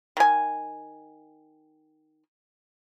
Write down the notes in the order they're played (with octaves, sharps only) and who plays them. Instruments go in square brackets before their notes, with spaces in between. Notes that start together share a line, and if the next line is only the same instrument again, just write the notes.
[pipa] D#3 G#5